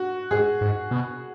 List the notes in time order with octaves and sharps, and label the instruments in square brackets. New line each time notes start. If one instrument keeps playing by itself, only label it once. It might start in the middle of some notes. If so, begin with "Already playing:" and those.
Already playing: [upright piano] F#4
[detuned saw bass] G#2 [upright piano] G#4
[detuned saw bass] G#2
B2